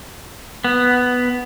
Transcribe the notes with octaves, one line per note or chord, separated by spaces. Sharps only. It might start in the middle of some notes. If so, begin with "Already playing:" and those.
B3